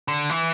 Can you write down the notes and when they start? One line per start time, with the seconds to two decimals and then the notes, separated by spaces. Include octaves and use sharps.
0.08 D3
0.30 E3